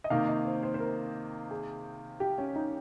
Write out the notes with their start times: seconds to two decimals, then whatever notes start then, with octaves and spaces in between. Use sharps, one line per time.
0.04 D#5
0.10 C3 D#3 A#3 D#4 F5
0.28 D#5
0.45 C5
0.63 C5
0.74 C5
0.80 A#4
1.51 G#4
2.20 G4
2.38 C#4
2.56 D#4